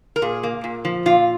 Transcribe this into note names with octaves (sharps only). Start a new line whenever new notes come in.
A#4
A#2 G#4
A#3
A#2
F3
A#2 F4